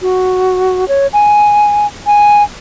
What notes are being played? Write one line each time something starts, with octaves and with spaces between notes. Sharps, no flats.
F#4
C#5
G#5
G#5